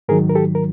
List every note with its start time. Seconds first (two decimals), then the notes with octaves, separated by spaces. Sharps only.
0.09 G#2 D#3 F#3 G#4 A#4
0.30 A#4
0.35 G4 A4
0.55 A#4